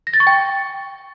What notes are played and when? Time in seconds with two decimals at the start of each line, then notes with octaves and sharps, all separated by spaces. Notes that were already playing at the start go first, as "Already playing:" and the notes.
0.07 A#6
0.14 A6
0.20 C#6
0.27 G5